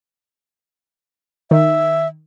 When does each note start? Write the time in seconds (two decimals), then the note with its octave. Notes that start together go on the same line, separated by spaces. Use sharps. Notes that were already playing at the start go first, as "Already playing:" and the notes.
1.51 D#3 E5